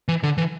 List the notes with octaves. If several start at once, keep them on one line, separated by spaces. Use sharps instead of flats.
E3
D3
E3